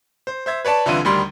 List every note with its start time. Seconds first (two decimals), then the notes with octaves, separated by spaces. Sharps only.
0.27 C5
0.46 C5 E5 G#6
0.65 B4 C#5 D5 A5
0.86 C2 D3 E3 E4 F4 D#7
1.05 D2 D#3 G3 B5 C6